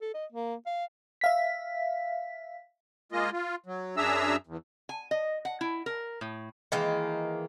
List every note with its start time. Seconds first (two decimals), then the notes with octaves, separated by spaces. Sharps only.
0.01 A4
0.14 D#5
0.32 A#3
0.66 F5
1.21 E5 F5 B6
3.12 G#3 A#3 F4 D#5
3.33 F4
3.66 F#3
3.97 F#2 D4 G#4 E5 A#5 E6
4.47 E2
4.89 G#5
5.11 D#5
5.45 F#5
5.61 E4
5.86 A#4
6.21 A2
6.72 D#3 E3 G#3 A#3